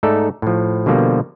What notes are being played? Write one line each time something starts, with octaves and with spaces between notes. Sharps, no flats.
G#2 A3 D#4 A4 D5
A2 F3
B2 D3 F3 G3 A#3